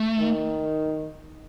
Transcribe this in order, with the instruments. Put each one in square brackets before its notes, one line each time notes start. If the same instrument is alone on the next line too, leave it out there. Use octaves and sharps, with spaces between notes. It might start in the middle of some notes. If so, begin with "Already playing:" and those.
Already playing: [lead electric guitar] A3
[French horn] D#3